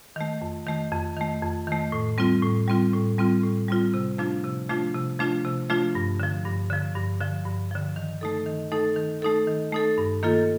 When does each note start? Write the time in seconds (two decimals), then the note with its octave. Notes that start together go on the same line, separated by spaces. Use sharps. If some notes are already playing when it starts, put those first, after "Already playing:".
0.16 D#3 A3
0.42 F2
0.67 D#3 A3
0.92 F2
1.17 D#3 A3
1.42 F2
1.67 D#3 A3
1.92 A2
2.18 G3 C4 F4
2.42 A2
2.68 G3 C4 F4
2.93 A2
3.18 G3 C4 F4
3.43 A2
3.68 G3 C4 F4
3.94 C3
4.18 F3 A3 D4 F4
4.44 C3
4.69 F3 A3 D4 F4
4.94 C3
5.19 F3 A3 D4 F4
5.45 C3
5.70 F3 A3 D4 F4
5.95 G2
6.20 D3 F3
6.45 G2
6.70 D3 F3
6.95 G2
7.21 D3 F3
7.46 G2
7.71 D3 F3
7.96 D#3
8.21 A3 D#4 A4
8.46 D#3
8.72 A3 D#4 A4
8.96 D#3
9.22 A3 D#4 A4
9.47 D#3
9.72 A3 D#4 A4
9.98 G2
10.23 D#3 A#3 F4 A4